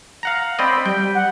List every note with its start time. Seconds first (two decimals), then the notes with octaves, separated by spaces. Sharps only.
0.23 F5 F#5 A#5
0.59 C4 D5 D#5 B5
0.86 G3 G5
1.15 F#5